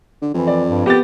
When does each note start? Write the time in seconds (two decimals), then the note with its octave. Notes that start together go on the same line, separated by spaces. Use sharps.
0.22 D3
0.34 F2 E3
0.47 D5
0.69 G2
0.86 B3 G4 A6